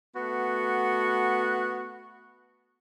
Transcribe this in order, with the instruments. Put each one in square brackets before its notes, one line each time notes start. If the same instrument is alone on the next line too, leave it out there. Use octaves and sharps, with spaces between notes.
[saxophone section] A3 B3 F#4